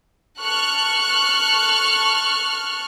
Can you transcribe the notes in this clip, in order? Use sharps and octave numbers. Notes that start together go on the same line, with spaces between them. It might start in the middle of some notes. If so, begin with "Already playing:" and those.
A4 C#6 F6 F#6